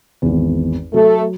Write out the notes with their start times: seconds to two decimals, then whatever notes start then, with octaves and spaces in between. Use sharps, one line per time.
0.22 G#1 E2
0.94 F#3 A3 A4